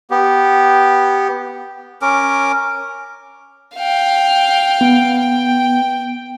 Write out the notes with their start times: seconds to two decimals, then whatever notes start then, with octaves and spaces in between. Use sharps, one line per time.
0.11 B3 G4
2.02 C#4 A#4 D6
3.76 F5 G5
4.81 B3
5.19 G5